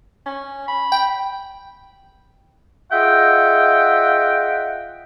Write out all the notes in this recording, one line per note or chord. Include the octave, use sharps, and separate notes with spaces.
C#4
B5
G5
F4 G#4 D#5 E5 F#5 G5